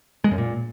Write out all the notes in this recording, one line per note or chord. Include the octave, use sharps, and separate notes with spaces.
G#3
F#2
A#2